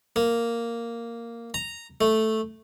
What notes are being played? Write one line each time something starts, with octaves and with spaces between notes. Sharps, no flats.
A#3
A#5
A3